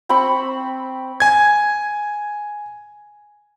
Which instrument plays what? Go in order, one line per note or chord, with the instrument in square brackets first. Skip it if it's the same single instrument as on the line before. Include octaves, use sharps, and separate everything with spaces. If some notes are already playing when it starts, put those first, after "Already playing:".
[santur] C4 G5 B5 C#6
[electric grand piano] G#5 G#6